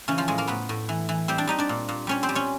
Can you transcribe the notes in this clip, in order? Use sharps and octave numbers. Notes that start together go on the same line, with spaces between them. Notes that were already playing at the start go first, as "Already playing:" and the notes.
C#3 E3 C#4
F3 F4
A2 G#3 G#4
A#3 A#4
A2 B3 B4
A2
E3
E3
G3 C4 C5
D4 D5
G3 D#4 D#5
D4 D5
A#2
A#2
G3 C#4 C#5
C4 C5
G3
C#4 C#5